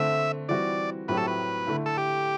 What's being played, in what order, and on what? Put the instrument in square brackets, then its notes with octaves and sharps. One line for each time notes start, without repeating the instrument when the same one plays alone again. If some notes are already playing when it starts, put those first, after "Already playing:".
Already playing: [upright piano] D3 A3 C4 [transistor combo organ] E5
[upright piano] E3 G3 C4 F#4 [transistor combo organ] D5
[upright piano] A2 F#3 C4 G4 [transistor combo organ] B4
[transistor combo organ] A4
B4
[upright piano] D3 A3 E4
[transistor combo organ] A4
G4